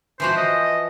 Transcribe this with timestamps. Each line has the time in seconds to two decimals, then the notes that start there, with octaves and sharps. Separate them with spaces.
0.20 E3 F3 F#4 C5
0.37 D#5